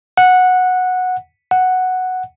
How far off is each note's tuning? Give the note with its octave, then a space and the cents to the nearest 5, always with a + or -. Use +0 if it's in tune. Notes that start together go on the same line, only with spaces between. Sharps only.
F#5 -10
F#5 +0